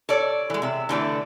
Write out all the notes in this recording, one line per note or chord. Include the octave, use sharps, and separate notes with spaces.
A4 C#5 D5
E3 G#3
C3 E5
D3 E3 A3 D4